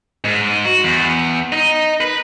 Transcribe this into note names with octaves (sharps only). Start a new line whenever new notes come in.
G#2
F#4
E2
D#4
B4